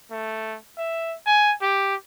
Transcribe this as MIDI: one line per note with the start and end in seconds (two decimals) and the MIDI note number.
0.12 0.58 57
0.78 1.16 76
1.27 1.53 80
1.62 1.95 67